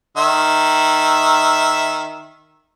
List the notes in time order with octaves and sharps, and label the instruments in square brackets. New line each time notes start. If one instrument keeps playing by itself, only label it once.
[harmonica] D#3 E5